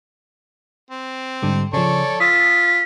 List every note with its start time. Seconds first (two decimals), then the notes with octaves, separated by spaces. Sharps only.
0.91 C4
1.43 G#2 D3 G3
1.73 C#3 F3 A4 C#5 D5
2.20 F4 D#6 E6 A6 B6